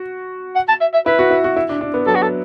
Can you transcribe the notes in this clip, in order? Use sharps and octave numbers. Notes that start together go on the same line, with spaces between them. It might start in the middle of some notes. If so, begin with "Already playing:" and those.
Already playing: F#4
F#5
A5
E5
E5
E4 B4
F#4
E4
F#4
E4
D4
D4
B3
F#3 A4
F#4
A4